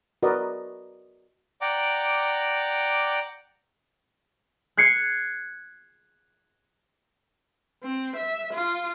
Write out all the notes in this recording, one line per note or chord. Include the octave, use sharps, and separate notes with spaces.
F#4 A#4 B4 D5 D#5
D5 F#5 G5 A#5 D6
F#6 G#6 C7 C#7
C4
E5
F4